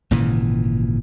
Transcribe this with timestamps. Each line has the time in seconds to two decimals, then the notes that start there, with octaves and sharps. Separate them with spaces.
0.11 G#1 A#2 C#3 E3